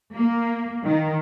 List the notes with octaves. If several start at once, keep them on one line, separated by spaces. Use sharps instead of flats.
A#3
D#3